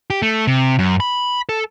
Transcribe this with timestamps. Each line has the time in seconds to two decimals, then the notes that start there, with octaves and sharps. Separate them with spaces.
0.10 G4
0.22 A3
0.47 C3
0.79 F#2
1.00 B5
1.49 A4